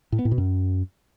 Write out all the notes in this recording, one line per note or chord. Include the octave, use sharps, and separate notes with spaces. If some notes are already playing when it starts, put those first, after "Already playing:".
A2
B3
A2
B2
F#2